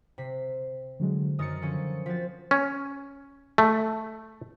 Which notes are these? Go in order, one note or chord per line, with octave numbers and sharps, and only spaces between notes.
C3 B6 C7
D3 F#3 G#3
F#2 D#3 A#4 D#6 A6 C#7
D3 F3 C#4
F3 C4 F#4 A6 B6
C#4
A3